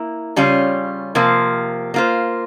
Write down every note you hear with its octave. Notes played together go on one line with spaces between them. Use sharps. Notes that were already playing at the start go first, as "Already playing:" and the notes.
Already playing: A#3 E4
C#3 G3 C#4 F4
C3 F3 A#3
A#3 F4 C5